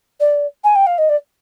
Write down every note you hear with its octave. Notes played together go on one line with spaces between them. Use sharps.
D5
G#5
G5
F5
D#5
D5